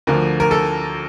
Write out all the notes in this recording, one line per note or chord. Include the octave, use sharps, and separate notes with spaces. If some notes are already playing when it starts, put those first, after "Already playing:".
D2 D3 F3 A#4
A#4
A4